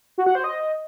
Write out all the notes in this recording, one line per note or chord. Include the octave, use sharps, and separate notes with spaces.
F#4
F#5
C5
D#5